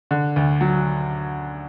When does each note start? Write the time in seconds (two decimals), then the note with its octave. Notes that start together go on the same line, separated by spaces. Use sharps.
0.11 D3
0.36 D2
0.61 F#3